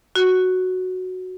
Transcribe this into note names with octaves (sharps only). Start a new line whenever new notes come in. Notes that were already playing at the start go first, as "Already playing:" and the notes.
F#4